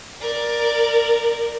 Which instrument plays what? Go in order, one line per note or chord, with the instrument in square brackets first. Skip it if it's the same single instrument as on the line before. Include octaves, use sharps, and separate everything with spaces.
[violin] A#4 D5